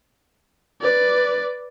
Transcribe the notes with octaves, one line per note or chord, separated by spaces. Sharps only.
B4 D5